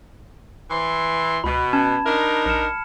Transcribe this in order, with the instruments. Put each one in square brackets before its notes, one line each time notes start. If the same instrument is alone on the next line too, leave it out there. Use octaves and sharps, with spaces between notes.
[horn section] E3 C6
[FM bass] C#2 [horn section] B2 [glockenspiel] B5
[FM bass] C#4 [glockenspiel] A5 G#6 E7
[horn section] D4 D#4 A#4
[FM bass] A#1 [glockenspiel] F6 C#7 E7